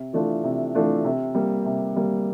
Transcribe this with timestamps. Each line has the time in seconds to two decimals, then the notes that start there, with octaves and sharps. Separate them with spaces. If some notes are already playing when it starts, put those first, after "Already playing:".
Already playing: C3
0.13 E3 A3 D4 F4
0.44 C3
0.75 E3 A3 D4 F4
1.05 C3
1.35 G3 A#3
1.65 C3
1.96 G3 A#3